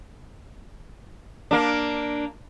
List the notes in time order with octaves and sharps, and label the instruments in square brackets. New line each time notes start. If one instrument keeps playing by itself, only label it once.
[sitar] A#3 D4